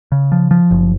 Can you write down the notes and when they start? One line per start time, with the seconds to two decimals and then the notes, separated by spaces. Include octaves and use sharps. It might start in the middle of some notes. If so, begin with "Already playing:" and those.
0.12 C#3
0.32 F3
0.51 F3
0.71 F#1